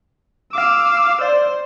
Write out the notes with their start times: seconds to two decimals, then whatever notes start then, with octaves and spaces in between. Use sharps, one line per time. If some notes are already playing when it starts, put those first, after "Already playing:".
0.53 F5 D6 E6
1.21 C5 D5